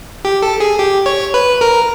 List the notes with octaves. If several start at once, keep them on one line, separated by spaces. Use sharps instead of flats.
G4
A4
G#4
G4
C#5
B4
A#4